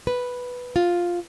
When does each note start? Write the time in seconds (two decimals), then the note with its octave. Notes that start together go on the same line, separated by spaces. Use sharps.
0.07 B4
0.76 F4